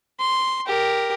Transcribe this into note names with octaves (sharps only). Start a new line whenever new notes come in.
C6
G4 A#4